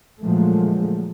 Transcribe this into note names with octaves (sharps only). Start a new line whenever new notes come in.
A#2 D3 F3 F#3 G#3 A3